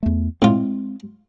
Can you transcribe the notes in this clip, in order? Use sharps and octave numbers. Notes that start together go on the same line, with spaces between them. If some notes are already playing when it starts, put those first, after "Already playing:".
E2 A3
A2 G#3 C4 F4